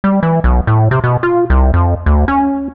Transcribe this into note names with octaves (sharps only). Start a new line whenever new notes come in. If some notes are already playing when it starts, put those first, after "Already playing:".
G3
E3
B1
A2
C3
B2
F4
C2
F2
D2
C#4